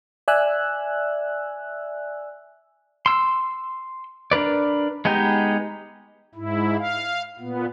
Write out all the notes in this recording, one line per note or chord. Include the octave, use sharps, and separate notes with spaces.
D5 E5 G#5 E6 F#6
C6 E6
D4 A#4 B4 D5
G#3 B3 D#4 G4
G#2 E4
F5
A#2 B3